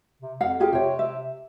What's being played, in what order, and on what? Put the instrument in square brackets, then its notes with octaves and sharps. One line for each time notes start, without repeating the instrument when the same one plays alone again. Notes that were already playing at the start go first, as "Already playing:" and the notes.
[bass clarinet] C3
[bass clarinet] F2 [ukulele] F5 F#5
[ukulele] F4 G4 G#4
[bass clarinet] C3 [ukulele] C#5 G5
[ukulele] E5